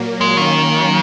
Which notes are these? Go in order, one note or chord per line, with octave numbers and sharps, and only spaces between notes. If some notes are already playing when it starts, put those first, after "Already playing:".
Already playing: A#2 F#3 A#3
G#3
D#3 F#3 A#3 C#4